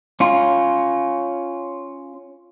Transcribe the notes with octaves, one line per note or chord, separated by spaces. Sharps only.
C#4 F4